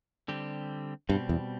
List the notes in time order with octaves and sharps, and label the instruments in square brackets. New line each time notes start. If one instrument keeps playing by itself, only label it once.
[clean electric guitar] D3 G3 C4 G4
[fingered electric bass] G2 [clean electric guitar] B2 G3 C4
[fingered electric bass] E2